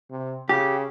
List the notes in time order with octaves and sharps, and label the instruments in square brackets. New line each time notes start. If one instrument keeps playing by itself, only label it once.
[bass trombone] C3
[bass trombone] C#3 [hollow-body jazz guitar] G4